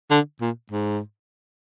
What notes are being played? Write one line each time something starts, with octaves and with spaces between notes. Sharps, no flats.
D3
A#2
G#2